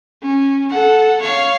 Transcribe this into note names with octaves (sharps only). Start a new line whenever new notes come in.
C#4
A4 F#5
C#5 F5